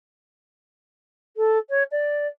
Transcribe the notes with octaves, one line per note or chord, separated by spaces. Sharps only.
A4
C#5
D5